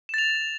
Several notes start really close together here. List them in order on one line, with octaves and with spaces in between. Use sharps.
E7 A6 F7